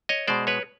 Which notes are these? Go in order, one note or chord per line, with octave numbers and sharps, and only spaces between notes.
C#5 D#5
B2 G#3 C5 D5
B4 C#5